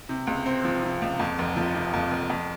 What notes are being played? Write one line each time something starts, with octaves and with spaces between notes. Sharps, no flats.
C3
C#2
C4
F3
C3
C#2
F2
F1
F3
C3
F2
F1
F2